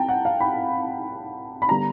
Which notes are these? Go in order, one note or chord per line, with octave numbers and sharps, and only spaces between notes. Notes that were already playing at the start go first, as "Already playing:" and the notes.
Already playing: C2 C3 G5 A5 A#5
F#5
F5
B5
B5
D3 G3 B3 D4 A#5